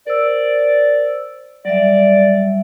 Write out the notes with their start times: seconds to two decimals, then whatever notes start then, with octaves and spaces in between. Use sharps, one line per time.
0.07 A#4 C5 D5 E6
1.65 F#3 G3 D5 E5